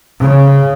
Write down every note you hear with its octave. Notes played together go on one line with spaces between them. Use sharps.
C#3